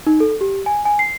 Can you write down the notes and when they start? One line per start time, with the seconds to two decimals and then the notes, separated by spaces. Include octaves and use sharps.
0.07 D#4
0.20 A4
0.41 G4
0.66 G#5
0.85 G#5
0.99 C7